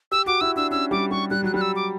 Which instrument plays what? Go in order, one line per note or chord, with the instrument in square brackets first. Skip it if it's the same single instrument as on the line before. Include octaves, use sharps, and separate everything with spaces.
[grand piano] G4 [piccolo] E6
[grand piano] F#4 [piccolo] D6
[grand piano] E4 [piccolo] E6
[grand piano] D4 [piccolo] E6
[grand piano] C#4 [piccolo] E6
[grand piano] G3 [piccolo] D6
[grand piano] G3 [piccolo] C#6
[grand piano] G3 [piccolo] F#6
[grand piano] F#3 [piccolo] F#6
[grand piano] G3 [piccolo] F#6
[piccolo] E6
D6